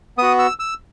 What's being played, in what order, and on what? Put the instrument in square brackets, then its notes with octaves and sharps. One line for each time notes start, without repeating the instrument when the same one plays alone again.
[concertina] B3 F#4 D#6
E6
E6